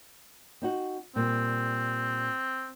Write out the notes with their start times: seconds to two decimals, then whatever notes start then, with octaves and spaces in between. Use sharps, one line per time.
0.62 C4 D#4 F#4
1.16 A#2 G3 C4